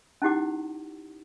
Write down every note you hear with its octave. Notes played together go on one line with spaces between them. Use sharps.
C#4 D#4 E4 G4 F#5 D6